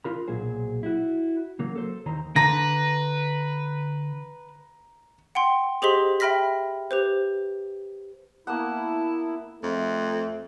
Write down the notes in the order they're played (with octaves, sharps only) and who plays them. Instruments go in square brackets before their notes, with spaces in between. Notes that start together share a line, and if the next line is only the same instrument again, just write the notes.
[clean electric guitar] D4 F4 A#4 B5
B1 A#2 F#3 G#4 C5
E4 F#4
C#3 F#3 A#3
A4 C5
D#2 D#3 C5 A#5
[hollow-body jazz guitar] D3 [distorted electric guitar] B4 [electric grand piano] A#5 A#6
[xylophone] F#5 G5 C6
G4 G#4 C5 D#5 C6 B6
E5 G5 B5 F6 A#6 B6
G4 B4 C5
[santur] A#3 B3 F#5 [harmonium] E4 [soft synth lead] A5
[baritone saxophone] F2 [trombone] A3